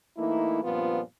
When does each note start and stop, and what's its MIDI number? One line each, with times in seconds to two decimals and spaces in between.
0.18 0.60 52
0.18 0.60 57
0.18 0.60 58
0.18 0.60 63
0.18 0.60 64
0.63 1.00 43
0.63 1.00 46
0.63 1.00 53
0.63 1.00 59
0.63 1.00 60
0.63 1.00 65